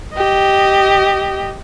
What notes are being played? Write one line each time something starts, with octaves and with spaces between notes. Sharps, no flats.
G4 D#5